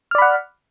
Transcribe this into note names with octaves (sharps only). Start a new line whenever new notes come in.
D5 F#5 B5 F6